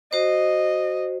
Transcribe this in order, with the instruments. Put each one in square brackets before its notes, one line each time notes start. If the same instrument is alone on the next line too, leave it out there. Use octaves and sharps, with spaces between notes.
[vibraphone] F#4 C5 [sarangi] D#5